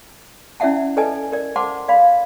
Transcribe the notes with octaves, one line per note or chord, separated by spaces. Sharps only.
C#4 E4 D5 E5 F#5 A5
A4 B4 D5 D#5 G#5 A5
A#4 D5
C5 F#5 A5 C6 D6
D5 F5 B5